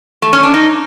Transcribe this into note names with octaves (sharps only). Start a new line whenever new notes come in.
A3
C#4
D4
D#4